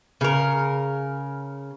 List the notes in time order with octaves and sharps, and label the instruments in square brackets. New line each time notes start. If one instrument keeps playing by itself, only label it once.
[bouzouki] C#3 A#4